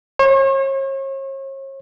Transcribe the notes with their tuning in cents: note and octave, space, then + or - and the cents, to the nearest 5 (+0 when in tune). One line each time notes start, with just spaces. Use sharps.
C#5 -40